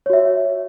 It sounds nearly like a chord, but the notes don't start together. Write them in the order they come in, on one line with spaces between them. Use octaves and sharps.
C#5 F#4 E5